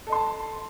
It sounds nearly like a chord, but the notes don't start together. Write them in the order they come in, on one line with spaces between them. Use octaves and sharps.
A4 D#5 C6 A5